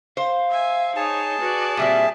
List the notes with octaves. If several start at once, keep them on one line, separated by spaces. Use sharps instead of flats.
C5 F5
E5 G#5
D#4 G#4 C#5 A5
F#4 B4 D5
A#2 G3 C4 E5